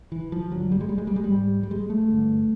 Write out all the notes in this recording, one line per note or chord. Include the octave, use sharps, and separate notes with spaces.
E3
F3
G2 D3 F#3
G3
G#3
G3
G#3
G3
G#3
G3
G#2
G3
G#3
A3
G2 D3